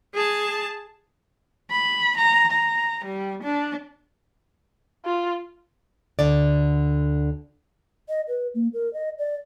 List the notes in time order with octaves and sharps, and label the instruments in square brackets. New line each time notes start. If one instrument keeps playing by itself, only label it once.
[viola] G#4 A5
[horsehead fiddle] B5
A#5
A#5
G3
D4
[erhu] F4
[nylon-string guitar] D2 D3 D5
[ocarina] D#5
B4
A#3
A#4
D#5
D5